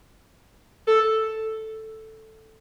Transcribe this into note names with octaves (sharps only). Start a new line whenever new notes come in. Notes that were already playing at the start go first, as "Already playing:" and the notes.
A4